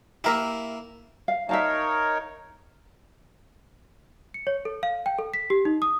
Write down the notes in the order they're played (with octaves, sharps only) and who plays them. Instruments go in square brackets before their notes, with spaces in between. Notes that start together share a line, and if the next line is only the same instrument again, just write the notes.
[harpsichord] A#3 E4 [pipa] G4 A#4 E5
[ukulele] F5
[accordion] D#4 A#4 C#5 [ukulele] E5 F5 A5
[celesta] C#7
C#5
A4
F5
G5
A4
B6
G4
D#4
D#6